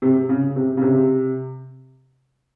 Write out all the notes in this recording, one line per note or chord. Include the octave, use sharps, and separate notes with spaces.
C3
C#3
C3
C#3
C3